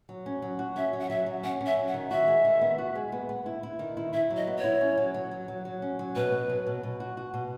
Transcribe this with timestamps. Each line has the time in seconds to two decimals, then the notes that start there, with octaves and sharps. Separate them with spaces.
0.09 F#3
0.26 C#4
0.42 F#3
0.59 F#4
0.76 C#4 E5
0.93 F#3
1.01 F#5
1.10 F#3 E5
1.26 F#3
1.43 C#4 F#5
1.61 C#4
1.66 E5
1.77 F#3
1.88 F#5
1.94 D#3
2.11 F#4 E5
2.27 G#3
2.45 D#3
2.61 B3
2.78 F#4
2.95 G#3
3.12 B3
3.29 B3
3.46 E4
3.63 E4
3.79 D#3
3.97 E4
4.13 E4 E5
4.30 F#3
4.36 D#5
4.47 B3
4.58 C#5
4.64 E4
4.81 C#4
4.98 F#3
5.14 F#3
5.31 F#3
5.48 F#3
5.65 F#3
5.82 C#4
5.99 F#3
6.16 B2 B4
6.32 B3
6.50 F#3
6.67 B2
6.83 B2
7.00 F#4
7.17 F#4
7.34 B2